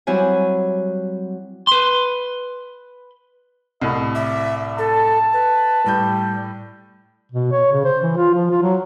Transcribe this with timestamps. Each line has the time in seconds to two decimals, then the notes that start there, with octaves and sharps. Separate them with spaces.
0.07 F#3 G3 C4 E4 G#5
1.67 B4 C6
3.82 C2 A2 D#5
4.15 D5 E5
4.78 A4 A5
5.33 B4
5.86 A2 G3 G6
7.32 B2
7.52 C#5
7.72 C#3
7.84 C5
8.03 E3
8.17 F4
8.35 F3
8.51 F4
8.63 F#3